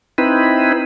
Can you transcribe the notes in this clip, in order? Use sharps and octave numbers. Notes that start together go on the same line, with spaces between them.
C4 D#4 E4 B4